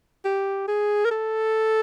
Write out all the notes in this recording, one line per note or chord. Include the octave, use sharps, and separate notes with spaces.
G4
G#4
A#4
A4